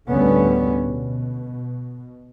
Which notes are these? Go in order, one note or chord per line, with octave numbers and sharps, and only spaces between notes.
D2 A2 D3 G3 B3 C#4
B2